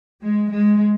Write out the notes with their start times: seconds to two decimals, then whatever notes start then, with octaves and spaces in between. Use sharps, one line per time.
0.22 G#3
0.52 G#3